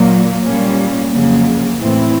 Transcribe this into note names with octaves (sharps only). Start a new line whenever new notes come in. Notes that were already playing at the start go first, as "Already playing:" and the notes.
Already playing: A#2 F#3 A#3
A#2 G3 A#3 C#4
F2 C#3 F#3 A#3
A2 E3 A3 C4 E4